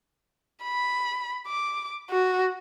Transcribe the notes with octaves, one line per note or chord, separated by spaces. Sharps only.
B5
D6
F#4